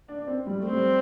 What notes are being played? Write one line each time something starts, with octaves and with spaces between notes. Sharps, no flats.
D4
D4
C4
G3
A3
C4
G3